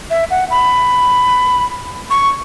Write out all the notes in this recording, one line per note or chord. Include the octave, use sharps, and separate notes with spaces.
E5
F#5
B5
C#6